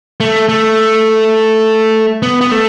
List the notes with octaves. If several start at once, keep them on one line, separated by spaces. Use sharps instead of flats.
A3
A3
B3
B3
A3